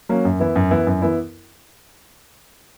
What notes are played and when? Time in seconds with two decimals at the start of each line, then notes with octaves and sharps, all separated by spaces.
0.09 F#3 A#3 C#4
0.25 F#2
0.40 E3 B3 E4
0.56 F#2
0.71 E3 B3 E4
0.87 F#2
1.02 E3 B3 E4